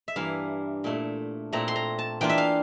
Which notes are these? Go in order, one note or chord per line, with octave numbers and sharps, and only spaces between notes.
E5
G2 E3 A#3 E4 F5
A#2 A3 E4
A#2 A3 C4 E4 A#5
C6
A#5
A5
E3 A#3 D4 F4 G5
E5
F5